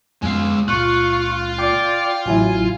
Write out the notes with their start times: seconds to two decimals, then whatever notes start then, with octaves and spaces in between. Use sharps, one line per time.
0.22 F2 G#3 B3 F5
0.68 C#2 A#2 F4 C#6 F#6
1.58 D5 G5 D6
2.26 A1 C#3 F#3 E4 G#5